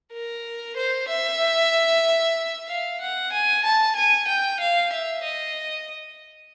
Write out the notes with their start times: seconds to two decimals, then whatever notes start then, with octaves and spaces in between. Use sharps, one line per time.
0.13 A#4
0.77 C5
1.08 E5
2.68 F5
3.01 F#5
3.32 G#5
3.64 A5
3.96 G#5
4.28 G5
4.60 F5
4.93 E5
5.24 D#5